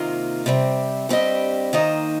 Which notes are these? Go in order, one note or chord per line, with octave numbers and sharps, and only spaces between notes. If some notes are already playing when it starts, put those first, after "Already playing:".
Already playing: C3 D#3 A#3 F4
C3 G3 C4
G2 G3 C4 G4 D#5
D#3 A#3 D#4 C5 D#5